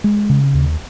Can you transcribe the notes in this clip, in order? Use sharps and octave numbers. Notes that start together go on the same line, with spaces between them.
G#3
C#3
D#2